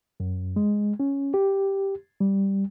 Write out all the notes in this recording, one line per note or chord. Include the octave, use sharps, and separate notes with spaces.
F#2
G#3
C#4
G4
G3